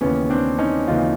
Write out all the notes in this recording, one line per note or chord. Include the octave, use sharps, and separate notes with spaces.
D#2 C#3 E3 B3 C#4
C4 D4
C#4 D#4
D#2 C#3 E3 D#4 F4